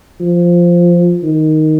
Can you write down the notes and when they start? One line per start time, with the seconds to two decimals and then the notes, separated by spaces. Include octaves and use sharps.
0.20 F3
1.23 D#3